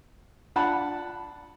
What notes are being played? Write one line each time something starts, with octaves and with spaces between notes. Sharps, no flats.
D4 F4 F#5 A5 B5